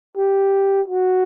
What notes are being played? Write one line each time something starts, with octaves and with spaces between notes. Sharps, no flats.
G4
F#4